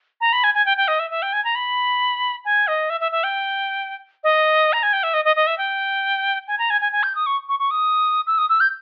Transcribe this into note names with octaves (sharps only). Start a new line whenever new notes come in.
A#5
B5
G#5
G#5
G5
G5
D#5
E5
E5
G5
G#5
A#5
B5
G#5
D#5
E5
E5
E5
G5
D#5
A#5
G#5
G5
E5
D#5
D#5
D#5
E5
G5
G#5
A#5
G#5
G#5
G#5
G6
D#6
C#6
C#6
C#6
D#6
E6
D#6
E6
G6